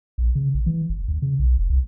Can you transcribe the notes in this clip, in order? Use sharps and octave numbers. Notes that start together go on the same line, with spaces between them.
A#1
C#3
A1
E3
G1
D#2
C#3
B1
F1
C2